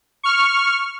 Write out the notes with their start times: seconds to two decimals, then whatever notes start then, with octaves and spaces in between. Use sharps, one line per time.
0.23 C#6 F6